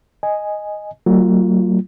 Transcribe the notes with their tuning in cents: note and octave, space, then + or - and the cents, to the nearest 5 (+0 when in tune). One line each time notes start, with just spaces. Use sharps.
D#5 +0 G#5 +0
F#3 +25 A#3 -45 F4 -5